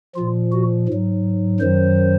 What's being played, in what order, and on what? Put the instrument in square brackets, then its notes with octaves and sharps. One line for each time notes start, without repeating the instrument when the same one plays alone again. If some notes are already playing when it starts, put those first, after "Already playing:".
[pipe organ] A#2 F3 F4
F#4
G#2 F#3
F#2 D#3 F#3 C5